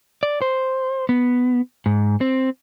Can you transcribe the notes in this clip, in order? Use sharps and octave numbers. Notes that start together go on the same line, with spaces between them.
D5
C5
B3
G#2
C4